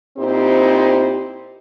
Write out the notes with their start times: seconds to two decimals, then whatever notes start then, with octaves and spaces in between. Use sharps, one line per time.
0.18 A#2 C4 D#4 E4 G4 C5